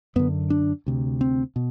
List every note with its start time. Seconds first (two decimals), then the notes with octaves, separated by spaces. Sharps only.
0.16 F#2 D3 B3
0.50 D4
0.87 D2 C3
1.21 C4
1.56 B2